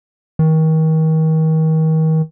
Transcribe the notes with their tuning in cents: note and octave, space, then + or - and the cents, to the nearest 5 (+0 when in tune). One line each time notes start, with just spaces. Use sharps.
D#3 +35